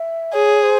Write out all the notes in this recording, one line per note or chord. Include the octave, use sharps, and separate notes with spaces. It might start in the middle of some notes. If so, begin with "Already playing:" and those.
Already playing: E5
G#4 C#5
C5